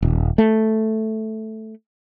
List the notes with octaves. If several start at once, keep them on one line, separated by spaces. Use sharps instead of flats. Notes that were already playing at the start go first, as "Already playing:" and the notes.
D#1
A3